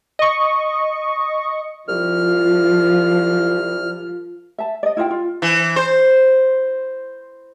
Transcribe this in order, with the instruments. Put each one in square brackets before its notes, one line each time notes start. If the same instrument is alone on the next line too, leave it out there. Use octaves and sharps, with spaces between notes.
[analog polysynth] D#5 C#6
[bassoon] C2 [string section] F3 [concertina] F6
[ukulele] E5 A5
D5 D#5
E4 F4 D#5 G5
F4
[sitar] E3
C5